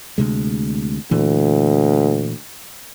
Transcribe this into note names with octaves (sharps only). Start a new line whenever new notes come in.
D2 C3 G#3
D2 A#2 E3